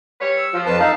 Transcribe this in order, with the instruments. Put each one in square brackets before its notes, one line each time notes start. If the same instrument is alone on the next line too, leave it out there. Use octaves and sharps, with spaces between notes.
[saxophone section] G3 B4 C#5
[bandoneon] E6
[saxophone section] F3
[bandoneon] F2 B4 A5
[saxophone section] D#3 A3 [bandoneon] D#4 F5 A5